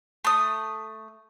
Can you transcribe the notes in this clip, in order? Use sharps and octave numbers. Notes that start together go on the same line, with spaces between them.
A3 D#6